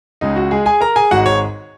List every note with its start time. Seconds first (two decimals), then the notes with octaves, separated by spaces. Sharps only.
0.21 C#2 C#3 G#3 D#4
0.36 F#4
0.51 G#3 G#4
0.66 G#4 G#5
0.81 A#4 A#5
0.96 G#4 G#5
1.11 G#1 G#2 G#3 F#4 F#5
1.26 C#5